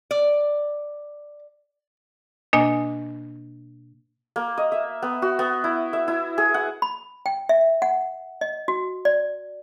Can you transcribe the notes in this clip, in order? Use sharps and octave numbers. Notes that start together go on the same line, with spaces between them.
D5
B2 A#3 D4 D#5 G#5
A#3
D#5
E5
B3
F#4
B3
E4
E5
E4
G#4
F#5
B5
G5
E5
F#5
D#5
F#4
D5